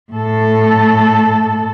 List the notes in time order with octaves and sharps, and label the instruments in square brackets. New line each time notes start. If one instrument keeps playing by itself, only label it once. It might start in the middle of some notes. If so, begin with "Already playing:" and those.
[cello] A2 A4